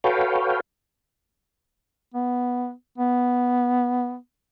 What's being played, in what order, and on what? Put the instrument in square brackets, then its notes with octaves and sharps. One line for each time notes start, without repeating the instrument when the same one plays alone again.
[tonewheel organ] F#4 A4 B4 C#5 F5 G5
[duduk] B3
B3